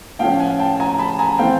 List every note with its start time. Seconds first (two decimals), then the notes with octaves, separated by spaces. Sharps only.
0.19 A2 F3 A3 C#4 F5 G5
0.39 F#5 G#5
0.59 G5 A5
0.80 G#5 A#5
0.99 A5 B5
1.19 G#5 A#5
1.38 E3 A3 C4 F5 G5